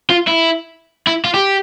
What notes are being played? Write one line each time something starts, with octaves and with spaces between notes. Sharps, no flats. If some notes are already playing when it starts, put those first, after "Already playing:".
F4
E4
E4
F4
G4